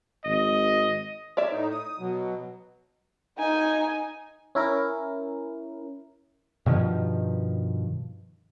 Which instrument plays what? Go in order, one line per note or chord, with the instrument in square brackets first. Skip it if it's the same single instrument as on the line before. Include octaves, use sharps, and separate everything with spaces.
[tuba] G#1 [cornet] D#5
[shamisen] C#5 D5 E5
[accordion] A2 D#4
D#6
B2 F#3
[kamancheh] D#4 G#5
[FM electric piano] C#4 E4 A#4
[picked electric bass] G2 B2 D#3 F3